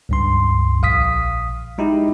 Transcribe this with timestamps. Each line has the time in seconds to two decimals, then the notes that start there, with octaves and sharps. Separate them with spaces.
0.09 C#2 G2 C6
0.82 A#1 F5 D#6 B6
1.78 G#3 D#4 E4 G4